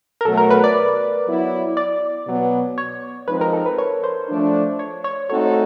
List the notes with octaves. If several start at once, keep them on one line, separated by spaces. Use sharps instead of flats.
A#4
B2 F#3 A3 A4
A#4
B4
D5
F#3 B3 E4
D5
B2 F#3 B3
C#5
F3 G#3 C4 D#4 B4
A#4
A4
B4
C#5
C5
F3 A3 D4
C#5
C#5
A3 C4 D#4 F#4 A4 C#5